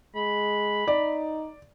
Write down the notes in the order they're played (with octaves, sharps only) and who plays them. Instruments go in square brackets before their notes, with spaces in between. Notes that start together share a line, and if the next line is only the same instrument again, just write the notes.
[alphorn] G#3 [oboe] B5
[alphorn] D#4 [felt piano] D5